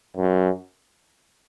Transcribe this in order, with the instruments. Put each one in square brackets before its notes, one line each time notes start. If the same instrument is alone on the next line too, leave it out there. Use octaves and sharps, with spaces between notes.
[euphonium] F#2